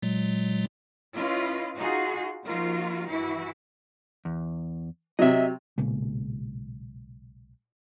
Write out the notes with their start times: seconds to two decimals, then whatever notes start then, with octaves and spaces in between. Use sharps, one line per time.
0.02 A#2 F#3 G#3
1.16 C#4 E4 F4 B4 D#5
1.77 D#4 F4 F#4 G#4
2.45 F3 A#3 D#4 F4 F#4 A#4
3.06 G2 E3 E4 F#4
4.25 E2
5.19 C3 F#3 D#5 E5
5.78 B1 A#2 C#3 G#3